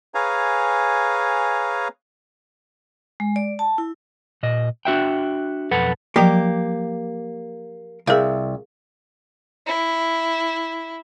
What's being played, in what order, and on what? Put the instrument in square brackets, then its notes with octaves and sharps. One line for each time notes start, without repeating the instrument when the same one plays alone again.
[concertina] G#4 B4 C#5 F5 G#5 A#5
[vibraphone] G#3
D5
A5
E4
[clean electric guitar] A#2 D#5
D4 F#4 E5 G5
B1 F2 A4 B4 F#5
[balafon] F3 F#3 G5 [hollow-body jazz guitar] A#3 G4
[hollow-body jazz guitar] C2 E5 [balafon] G#4 A#4 F5
[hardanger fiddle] E4